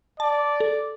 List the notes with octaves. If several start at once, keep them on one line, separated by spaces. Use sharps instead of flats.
D5 A5
A4